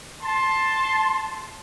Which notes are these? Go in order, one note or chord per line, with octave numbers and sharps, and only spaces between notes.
A5 C6